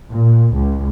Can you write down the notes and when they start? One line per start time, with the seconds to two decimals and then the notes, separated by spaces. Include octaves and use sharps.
0.11 A#2
0.54 C#2